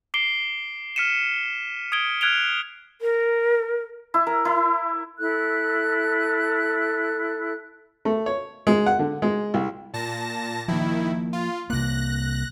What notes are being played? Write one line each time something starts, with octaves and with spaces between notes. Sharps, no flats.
D6 C7 D7 G7
F6 B6 C#7 D#7 E7
D#6 G#6 D7 G7
F6 F#6 G#6 D7 F7 G7
A#4
E4
A#4
E4
E4 A4 F#6
A3
C#5
G#3
F#5
D3
G#3
C2
A#2 A5 A#6
D#3 F3 A#3 E4
F4
C2 A#3 F#6 A#6